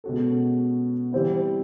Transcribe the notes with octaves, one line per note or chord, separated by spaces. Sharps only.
B2 G#3 C#4 F#4 A4
E3 G3 C4 E4